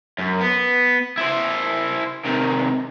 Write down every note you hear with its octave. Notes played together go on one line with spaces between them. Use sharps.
F#2
B3
E4 C5
C3 D#3